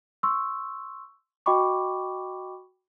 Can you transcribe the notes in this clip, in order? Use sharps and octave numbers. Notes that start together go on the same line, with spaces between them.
C6 C#6 E6
F#4 D#5 G5 B5 C#6 D6